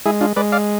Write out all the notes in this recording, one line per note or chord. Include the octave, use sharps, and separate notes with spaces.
G#3 E4 G#4
D4 F4
G#3 B4 D5
D5 F5